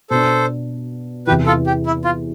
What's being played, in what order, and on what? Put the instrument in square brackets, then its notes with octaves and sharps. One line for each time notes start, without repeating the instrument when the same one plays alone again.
[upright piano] B2 B3 D4 [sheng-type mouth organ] A4 C5
[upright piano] E2 C3 E3 [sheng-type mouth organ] G4 B4
[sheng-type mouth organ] F4 A4
G4
E4
F4